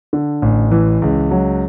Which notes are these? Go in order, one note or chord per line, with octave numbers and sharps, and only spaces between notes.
D3
A1
E3
C#2
F#3